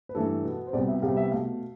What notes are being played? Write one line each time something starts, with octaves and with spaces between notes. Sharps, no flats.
B4
G2 E3 A3 A4
B2 B3
C5
C2 B2 G3 B3 D5
E5
C2 C3 G3 B3 F5
E5
B2 A3 F5